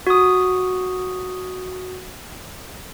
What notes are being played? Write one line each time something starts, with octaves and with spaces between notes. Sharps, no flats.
F#4 D#6